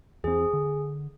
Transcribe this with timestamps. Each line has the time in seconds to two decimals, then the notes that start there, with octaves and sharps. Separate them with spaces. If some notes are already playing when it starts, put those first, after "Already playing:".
0.24 E2 C4 G#4
0.53 D3